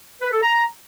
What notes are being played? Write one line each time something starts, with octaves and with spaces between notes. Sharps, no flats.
B4
A4
A#5